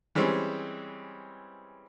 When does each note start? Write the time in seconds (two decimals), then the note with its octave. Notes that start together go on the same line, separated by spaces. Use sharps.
0.15 E3 G3 G#3 C4 C#4